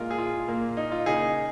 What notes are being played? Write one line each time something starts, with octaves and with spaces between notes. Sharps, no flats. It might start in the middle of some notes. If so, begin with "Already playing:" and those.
Already playing: A#2 G#3 F4 A#4
G#4
F4
A#2 A#3
D#4
F4
C#3 A#3 D#4 G#4